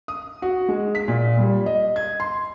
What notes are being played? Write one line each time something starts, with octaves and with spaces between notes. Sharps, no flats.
D#6
F#4
G#3
B6
A#2
G3
D#5
G#6
C6